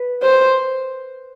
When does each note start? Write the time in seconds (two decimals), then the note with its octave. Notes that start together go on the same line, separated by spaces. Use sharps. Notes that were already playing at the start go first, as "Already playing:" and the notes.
Already playing: B4
0.23 C5